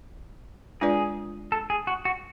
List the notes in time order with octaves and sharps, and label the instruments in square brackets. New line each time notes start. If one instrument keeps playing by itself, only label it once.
[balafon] G#3 D4 F4 B4 D5 [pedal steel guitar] G#4
[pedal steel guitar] A4
G#4
F#4
F#4